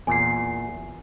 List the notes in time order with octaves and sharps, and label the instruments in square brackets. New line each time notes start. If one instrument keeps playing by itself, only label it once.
[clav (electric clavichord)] E2 A#2 [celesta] G#5 C7